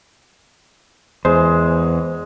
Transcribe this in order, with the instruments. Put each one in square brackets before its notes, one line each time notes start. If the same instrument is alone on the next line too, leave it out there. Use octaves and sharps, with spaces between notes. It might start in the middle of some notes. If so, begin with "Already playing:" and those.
[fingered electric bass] E2 [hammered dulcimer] G#3 [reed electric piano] C5